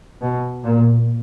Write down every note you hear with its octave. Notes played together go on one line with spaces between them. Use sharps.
B2
A#2